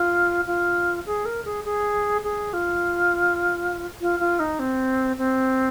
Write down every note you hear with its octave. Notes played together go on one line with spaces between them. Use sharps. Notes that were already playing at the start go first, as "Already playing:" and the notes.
Already playing: F4
F4
G#4
A#4
G#4
G#4
G#4
F4
F4
F4
D#4
C4
C4